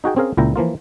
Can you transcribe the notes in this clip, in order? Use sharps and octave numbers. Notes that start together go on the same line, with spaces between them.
D#4 F#4 G#4 G5
C4 C#4 G#4 A#4 F5
C#2 A#2 E4 G5 A#5
E3 F3 A#3 F4